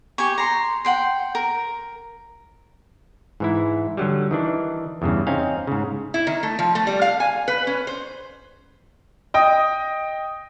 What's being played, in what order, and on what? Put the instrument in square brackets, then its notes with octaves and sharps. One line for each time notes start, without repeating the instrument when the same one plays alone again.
[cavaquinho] G4 G#5 C#6
A#5 C6
F#5 G5 C6
A#4
[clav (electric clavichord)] G#2 E3 E4
D3 F#3 G3
D#3 E3 D4
E2 G2 C#3
C4 C#4 D#4 F5
G#2 C#3
[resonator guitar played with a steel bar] E4
D#3
A3
F3
A3
G3
F5
G#5
B4
C#4
C5
[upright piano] D#5 G5 D#6